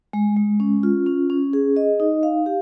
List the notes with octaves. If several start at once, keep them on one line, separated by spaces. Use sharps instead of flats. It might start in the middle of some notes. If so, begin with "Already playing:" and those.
G#3
G#3
C#4
F4
C#4
C#4
G#4
D#5
D#4
F5
G4